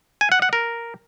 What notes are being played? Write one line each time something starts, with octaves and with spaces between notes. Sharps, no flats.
G#5
F#5
F#5
A#4